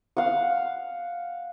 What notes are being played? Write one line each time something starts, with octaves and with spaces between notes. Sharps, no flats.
F5 F#5